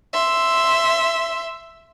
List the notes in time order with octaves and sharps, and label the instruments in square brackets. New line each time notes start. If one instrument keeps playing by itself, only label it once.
[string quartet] E5 C6